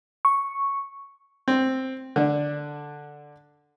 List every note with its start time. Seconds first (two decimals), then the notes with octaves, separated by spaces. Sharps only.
0.25 C#6
1.48 C4
2.16 D3 D4